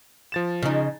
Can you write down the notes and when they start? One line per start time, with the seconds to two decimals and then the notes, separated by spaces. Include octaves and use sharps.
0.32 F3 A6 E7
0.63 C#3 D#4